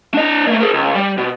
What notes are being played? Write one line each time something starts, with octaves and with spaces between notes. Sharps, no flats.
D4 D#5
A3 A#3
G#4 A#4
C#2
G3
B2